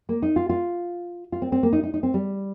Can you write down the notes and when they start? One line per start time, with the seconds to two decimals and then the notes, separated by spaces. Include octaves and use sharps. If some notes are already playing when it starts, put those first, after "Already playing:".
0.09 A#3
0.22 D#4
0.36 F4
0.49 F4
1.32 F4
1.42 C4
1.52 C4
1.63 A#3
1.73 D#4
1.83 D#4
1.94 D#4
2.03 C4
2.14 G3